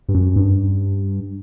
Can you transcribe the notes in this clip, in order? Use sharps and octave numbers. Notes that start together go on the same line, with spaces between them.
G2
F#2
G2